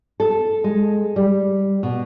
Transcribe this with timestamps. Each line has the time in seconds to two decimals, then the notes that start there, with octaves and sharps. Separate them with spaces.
0.20 A4
0.64 G#3
1.16 G3
1.83 B2